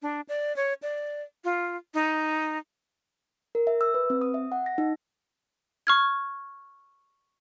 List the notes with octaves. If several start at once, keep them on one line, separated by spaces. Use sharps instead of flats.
D4
D5
C#5
D5
F4
D#4
A#4
E5
E6
B4
C4
D#6
E5
F#5
A#6
D#4
C#6 F6 G#6